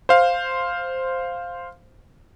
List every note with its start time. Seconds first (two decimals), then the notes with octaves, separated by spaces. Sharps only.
0.09 C5 F5